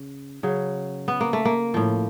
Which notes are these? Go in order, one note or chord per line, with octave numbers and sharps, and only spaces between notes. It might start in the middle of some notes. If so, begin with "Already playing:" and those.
Already playing: C#3
C#3 F#3
B3
A#3
A3
A#3
A2 F3